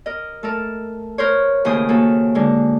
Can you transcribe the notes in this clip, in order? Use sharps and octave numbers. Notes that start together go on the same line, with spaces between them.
A#4 D#5
A3 A4 A#4
A#4 C5 C#5
D#2 A2 C#3 A3 C5 D#6
A#3 F#4 A4
G#2 D3 G#3